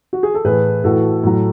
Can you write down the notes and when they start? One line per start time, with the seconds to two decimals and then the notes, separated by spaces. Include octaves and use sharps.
0.13 F#4
0.23 G#4
0.35 A4
0.45 A2 E3 G#4 B4
0.84 A2 E3 F#4 A4
1.23 A2 F#3